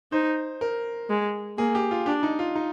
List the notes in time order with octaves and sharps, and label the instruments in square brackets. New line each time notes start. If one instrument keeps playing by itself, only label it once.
[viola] D#4 [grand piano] C5
[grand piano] A#4
[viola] G#3
[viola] A#3 [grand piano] G#4
[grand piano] G4
F4
[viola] D4 [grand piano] G4
[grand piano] D#4
F4
D#4